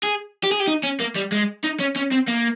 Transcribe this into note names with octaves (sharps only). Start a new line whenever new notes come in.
G#4
G4
G#4
G4
D#4
C#4
A#3
G3
G#3
D#4
C#4
C#4
C4
A#3